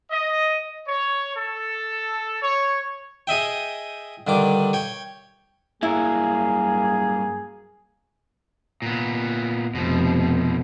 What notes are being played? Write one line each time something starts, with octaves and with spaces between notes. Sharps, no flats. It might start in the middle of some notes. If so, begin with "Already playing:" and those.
D#5
C#5
A4
C#5
G#4 D#5 E5 G5
G2 D3 D#3 D6
C#5 G5
G2 F#3 A#3 E4 G#4
A#2 B3
F1 B2 F3